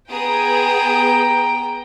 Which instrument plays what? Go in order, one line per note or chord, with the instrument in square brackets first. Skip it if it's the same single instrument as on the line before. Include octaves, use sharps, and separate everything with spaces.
[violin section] B3 G#4 D#6 [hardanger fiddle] G5 A#5